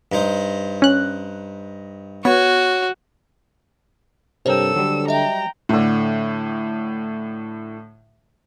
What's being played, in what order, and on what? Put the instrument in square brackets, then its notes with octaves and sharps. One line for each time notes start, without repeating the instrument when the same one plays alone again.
[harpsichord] G2 D#4 C5
[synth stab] C#4 F#6
[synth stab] B3 [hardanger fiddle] F#4 [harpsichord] C#5
[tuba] G2 [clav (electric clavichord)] C3 A#4 G5 [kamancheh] A4 E6 [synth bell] C5 C#5
[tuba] D3 [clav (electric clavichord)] F#3 G3
[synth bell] D#5 E5 [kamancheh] G5 A#5
[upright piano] A2 D3